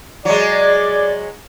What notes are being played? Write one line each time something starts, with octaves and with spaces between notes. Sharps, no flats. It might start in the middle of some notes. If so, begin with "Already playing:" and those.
F#3 G#3 D5